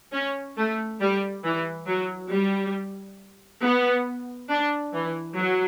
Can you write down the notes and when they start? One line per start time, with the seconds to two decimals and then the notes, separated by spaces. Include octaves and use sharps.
0.12 C#4
0.57 A3
1.00 G3
1.44 E3
1.87 F#3
2.31 G3
3.63 B3
4.50 D4
4.93 E3
5.38 F#3